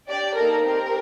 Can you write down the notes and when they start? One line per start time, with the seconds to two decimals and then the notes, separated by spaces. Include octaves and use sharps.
0.08 D4 G4 D5
0.37 A#3 D#4 A4 A#4
0.65 C4 G4 A#4